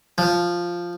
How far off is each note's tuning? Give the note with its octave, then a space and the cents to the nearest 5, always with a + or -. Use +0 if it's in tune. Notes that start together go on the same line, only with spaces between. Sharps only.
F3 +0